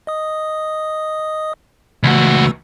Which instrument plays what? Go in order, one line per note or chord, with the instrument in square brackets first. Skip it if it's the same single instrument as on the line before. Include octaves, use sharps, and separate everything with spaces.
[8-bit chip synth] D#5 D#6
[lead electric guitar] C#2 F#4 [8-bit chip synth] E3 A3 E6